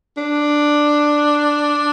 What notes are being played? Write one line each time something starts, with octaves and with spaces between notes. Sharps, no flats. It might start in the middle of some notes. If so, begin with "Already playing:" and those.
D4